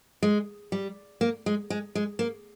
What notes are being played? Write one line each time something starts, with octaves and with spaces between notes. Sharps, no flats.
G#3
G3
A#3
G#3
G#3
G#3
A#3